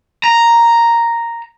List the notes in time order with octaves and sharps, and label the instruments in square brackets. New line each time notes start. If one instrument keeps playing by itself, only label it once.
[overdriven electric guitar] A#5